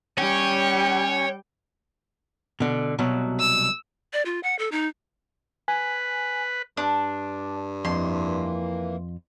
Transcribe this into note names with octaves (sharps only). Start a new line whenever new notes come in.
G3 C#4 C#5 G5
B2 D3
C2 B2 F#3
E6
D5
F4
F#5
A4
D#4
B4 G#5
G2 D4
F2 E3 A#3 C6